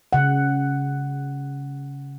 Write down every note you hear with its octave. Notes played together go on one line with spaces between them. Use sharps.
C#3 F#5